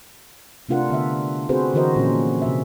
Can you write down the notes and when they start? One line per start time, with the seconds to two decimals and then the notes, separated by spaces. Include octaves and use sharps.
0.69 C3 A3 D4 F4 A#4 F#5
0.90 D3 B3 E5
1.49 C4 F#4 G#4 A4 B4 C5
1.74 D3 E3 F#4 A#4 C5 D#5
1.96 A#2 F3 C#4
2.42 C3 E5